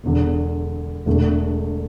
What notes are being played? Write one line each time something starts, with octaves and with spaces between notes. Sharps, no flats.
E1 E2 D3
E1 E2 D3 A3